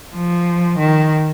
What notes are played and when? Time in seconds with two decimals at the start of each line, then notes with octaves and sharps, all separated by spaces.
0.15 F3
0.78 D#3